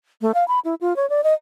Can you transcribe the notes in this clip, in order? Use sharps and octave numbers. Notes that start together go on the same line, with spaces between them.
A3
F5
B5
E4
F4
C#5
D5
D#5